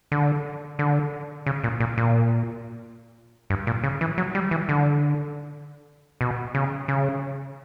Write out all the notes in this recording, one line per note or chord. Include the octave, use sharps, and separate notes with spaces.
D3
D3
C#3
A#2
A#2
A#2
G2
A#2
C#3
E3
F#3
G3
E3
D3
B2
C#3
C#3